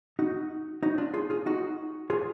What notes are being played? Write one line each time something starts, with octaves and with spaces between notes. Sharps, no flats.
D#4 F#4
D#4 F#4
D4 F4
F4 G#4
F4 G#4
D#4 F#4
F4 G#4